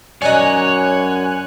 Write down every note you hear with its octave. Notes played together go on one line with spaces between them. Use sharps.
F#2 D#4 C#5 D5 G#5 F#6